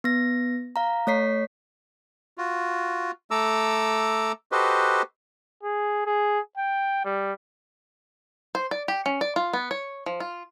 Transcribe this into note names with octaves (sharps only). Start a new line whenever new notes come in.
B3 A#6
F5 A#5
A3 C#5 B6 C7
F4 F#4
A3 A4 A#5 D6 E6
F#4 G4 A4 B4 C5 D#5
G#4
G#4
G5
G3
C5
D5
G4
C#4
D5
F4
B3
C#5
F3
F4